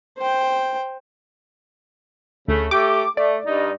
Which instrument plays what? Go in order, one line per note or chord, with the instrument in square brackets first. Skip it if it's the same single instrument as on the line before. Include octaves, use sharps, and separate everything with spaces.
[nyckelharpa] C5 G5
[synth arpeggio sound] D2 [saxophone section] C#3 A3
[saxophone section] A3 G4 [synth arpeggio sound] D6
[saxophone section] A3 [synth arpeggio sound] D5
[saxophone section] G2 D#4